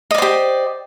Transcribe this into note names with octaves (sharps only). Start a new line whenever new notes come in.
G4 C5 D5 D#5